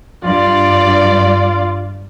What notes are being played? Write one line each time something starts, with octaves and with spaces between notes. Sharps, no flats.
G2 F4 D5